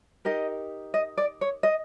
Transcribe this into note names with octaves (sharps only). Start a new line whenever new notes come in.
D#4 G4 A#4 D#5
D#5
D5
C#5
D#5